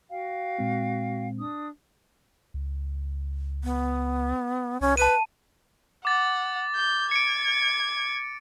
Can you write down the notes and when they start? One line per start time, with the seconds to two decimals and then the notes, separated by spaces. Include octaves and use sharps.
0.10 F#4 F5 G5
0.59 A#2 G#3 C4
1.39 D4 D#6
2.54 C#2
3.64 B3
4.81 C2 C#4
4.97 B4 A5 D#7
6.05 F#5 D6 A6
6.75 G6
7.11 G#6 C#7 D7